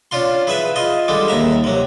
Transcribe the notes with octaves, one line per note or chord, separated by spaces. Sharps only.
C#4 D4 F4 C6
E4 G#4 B4 E5
F4 D#5
D3 G3 G#3 D4
D#2 E5 A#5
C3 F#3